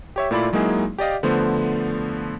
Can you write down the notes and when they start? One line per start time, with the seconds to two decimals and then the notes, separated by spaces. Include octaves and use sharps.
0.16 G4 C#5 E5
0.31 A#2 A3 E4 F4 D5 B5
0.53 F#3 G#3 A#3 D#4 E4 G#4
0.98 G4 D5 D#5 F5
1.23 D3 F3 A3 B3 C5